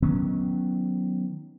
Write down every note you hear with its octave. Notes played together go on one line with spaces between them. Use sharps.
D#3 F#3 B3 C#4